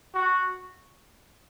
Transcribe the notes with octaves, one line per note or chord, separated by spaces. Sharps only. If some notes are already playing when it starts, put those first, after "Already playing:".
F#4